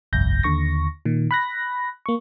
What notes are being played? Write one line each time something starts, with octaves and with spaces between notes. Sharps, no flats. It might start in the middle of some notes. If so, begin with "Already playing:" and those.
G1 C2 F2 G6 A#6
D#2 D3 C#6 A#6
A#2 D#3
B5 F#6 A#6
A#3 C#6